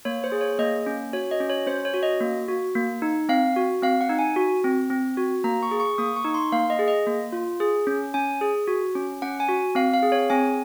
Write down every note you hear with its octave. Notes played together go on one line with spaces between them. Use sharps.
A#3 C#5
C5
G#4
C#5
A#3 D#5
C#4
F#4 C#5
D#5
C#4
C#5
C#4 C5
C#5
F#4
D#5
A#3
F#4
A#3
D#4
C4 F5
F#4
C4 F5
F#5
D#4
G#5
F#4
C4
C4
F#4
A#3 A#5
C#6
G#4
C#6
A#3 D#6
C#6
D#4
C6
A#3 F5
D#5
G#4
D#5
A#3
F4
G#4
C#4
C#4 G#5
G#4
F#4
C#4
C#4 F#5
G#5
F#4
C4 F5
F5
G#4
C#5
C4 G#5